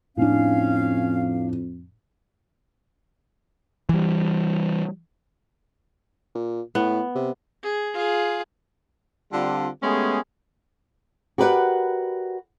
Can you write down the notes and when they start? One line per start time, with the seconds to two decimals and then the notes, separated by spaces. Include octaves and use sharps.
0.17 F2 A2 C#4 D4 F5
3.89 E3 G3
6.35 A#2
6.75 A2 B3
7.15 C3
7.63 G#4
7.94 F4 G#4
9.32 D3 G3 C4 D4 F4
9.83 G#3 A3 B3 C#4 G4 G#4
11.38 F#4 G4 A#4 B4 D5 F#5